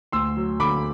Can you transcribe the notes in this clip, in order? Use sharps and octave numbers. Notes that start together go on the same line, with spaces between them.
D2 C6 E6
F#3
D3 B5 D6